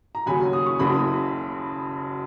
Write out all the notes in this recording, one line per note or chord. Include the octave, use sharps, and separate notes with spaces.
A#5
D#2 C#3 F#3 C#4 G#5 B5
D#6
C#6
F#1 F#2 C#3 B5 D#6